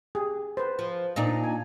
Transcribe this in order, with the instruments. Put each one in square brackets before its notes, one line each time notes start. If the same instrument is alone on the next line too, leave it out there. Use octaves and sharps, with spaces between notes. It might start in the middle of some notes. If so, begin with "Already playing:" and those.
[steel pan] G4 G#4
B4 C5
[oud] F3
A#2 D4 D#4
[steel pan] G#5